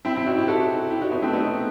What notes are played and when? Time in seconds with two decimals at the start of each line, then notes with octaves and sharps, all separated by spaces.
0.05 C4 E4
0.16 C4 E4
0.26 D#4 F#4
0.37 E4 G4
0.48 F#4 A4
0.90 E4 G4
1.01 D#4 F#4
1.11 B3 D#4
1.22 A3 C4
1.33 B3 D#4